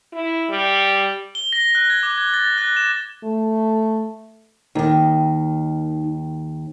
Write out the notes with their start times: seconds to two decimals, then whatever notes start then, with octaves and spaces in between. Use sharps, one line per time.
0.13 E4
0.49 G3
1.35 G7
1.53 A#6
1.75 F#6
1.90 G#6
2.03 D6
2.18 G#6
2.34 A6
2.58 F#6
2.77 E7
3.24 A3
4.75 D#2 D#3 D#4